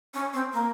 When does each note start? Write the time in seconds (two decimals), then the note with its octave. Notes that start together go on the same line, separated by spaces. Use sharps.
0.14 C#4
0.33 C4
0.53 A#3